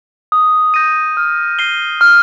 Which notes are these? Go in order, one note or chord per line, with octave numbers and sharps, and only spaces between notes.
D#6
G6 A#6 D#7
F6
C7 D#7 G7
F6